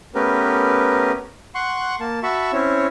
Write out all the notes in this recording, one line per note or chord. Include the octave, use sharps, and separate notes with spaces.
A3 B3 C#4 G4 A#4 B4
F#5 C6 C#6 F#6
A#3 A5
F#4 E5 A5 B5 C#6
C4 C#4 E4 C#5